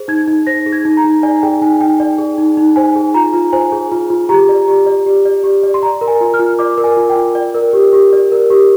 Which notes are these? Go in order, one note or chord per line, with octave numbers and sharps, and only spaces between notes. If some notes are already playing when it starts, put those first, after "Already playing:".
Already playing: G#4 C5
D#4 G#6
D#4
C5 A#6
G#4
G#6
D#4
A#5
D#4
D5 G#5
G#4 G5
D#4 G#5
D#4 G5
D5
G#4
D#4
D#4
C5 G#5
G#4
F4 A#5
F4
C5 G#5
G#4
F4
F4
G4 A#5
D5
G4
D5
G4
D5
G4
D5
C6
D5 A#5
A#4
G#5
F4
F6
F4
D5 D6
A#4
G#5
F4
G5
F4
D5
A#4
G4
G4
D5
A#4
G4